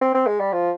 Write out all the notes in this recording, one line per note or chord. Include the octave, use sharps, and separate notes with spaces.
C4
C4
G#3
G3
F3